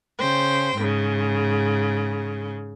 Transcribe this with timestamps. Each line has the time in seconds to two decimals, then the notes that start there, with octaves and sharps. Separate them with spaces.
0.19 C#3 C5 G5
0.77 G#2 C#3